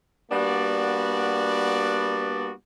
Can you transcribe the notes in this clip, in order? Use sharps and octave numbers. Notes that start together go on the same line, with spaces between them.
G3 A#3 B3 D4 F#4 D5